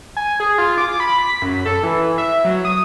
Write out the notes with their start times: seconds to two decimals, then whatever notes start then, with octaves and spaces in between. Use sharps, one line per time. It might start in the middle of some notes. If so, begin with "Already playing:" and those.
0.17 G#5
0.40 G#4
0.58 F4
0.78 D6
1.00 B5
1.18 B6
1.42 F#2
1.65 A4
1.83 E3
2.18 E5
2.45 F#3
2.65 D#6